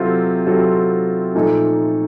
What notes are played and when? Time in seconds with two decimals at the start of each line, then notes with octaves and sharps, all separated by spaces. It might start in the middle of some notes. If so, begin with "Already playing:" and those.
Already playing: C3 F#3 C4 F4 A4
0.46 C3 F#3 C4 F4 A4
1.35 A#2 F3 A3 D#4 A4